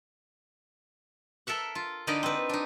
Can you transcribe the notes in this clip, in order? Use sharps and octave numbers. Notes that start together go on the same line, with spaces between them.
A4 A#4 E5 F#5
F4
D3 D#4 A#4 B4 D5 D#5
C4 B4
D4 D#4